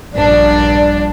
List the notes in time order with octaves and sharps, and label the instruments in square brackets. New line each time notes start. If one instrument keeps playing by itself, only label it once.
[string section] A#1 G2 D4 [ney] D5